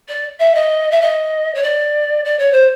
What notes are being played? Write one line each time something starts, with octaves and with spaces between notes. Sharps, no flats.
D5
E5
D#5
E5
D#5
C#5
D5
D5
C#5
C5